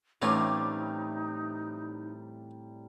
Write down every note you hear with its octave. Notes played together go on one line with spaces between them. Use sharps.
A2 C3 E3 G3 C#4 D#4 F4 D5